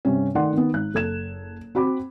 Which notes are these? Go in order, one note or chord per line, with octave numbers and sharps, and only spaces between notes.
G2 C3 C#4
D#3 A3 D5 F#5 C6
D#3 B3
G#1 F#6
F#1 A4 G#6 E7
C4 F#4 B5 D6